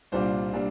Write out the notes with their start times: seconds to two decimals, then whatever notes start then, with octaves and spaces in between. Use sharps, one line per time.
0.12 C2 A#2 G3 D4 F4 C5
0.53 A#2 G3 D4